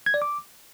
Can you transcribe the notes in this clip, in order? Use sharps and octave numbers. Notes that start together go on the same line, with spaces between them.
G#6
D5
D6